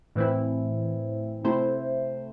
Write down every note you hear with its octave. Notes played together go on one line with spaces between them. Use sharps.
A2 E3 C4 E4
C3 A3 E4 C5